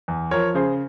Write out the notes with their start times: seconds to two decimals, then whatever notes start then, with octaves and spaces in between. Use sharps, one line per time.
0.08 E2
0.31 F3 A#4 C#5
0.55 C#3 G#4 C5